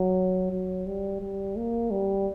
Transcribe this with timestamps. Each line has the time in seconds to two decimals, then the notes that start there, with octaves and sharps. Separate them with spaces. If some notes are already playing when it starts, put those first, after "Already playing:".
Already playing: F#3
0.51 F#3
0.86 G3
1.21 G3
1.57 A#3
1.91 G3